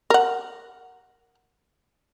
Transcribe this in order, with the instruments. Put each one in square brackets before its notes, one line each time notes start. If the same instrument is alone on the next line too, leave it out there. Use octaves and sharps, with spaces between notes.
[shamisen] A#4 F#5